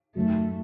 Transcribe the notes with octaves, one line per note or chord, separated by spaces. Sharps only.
F#2 D#3 F#3 A3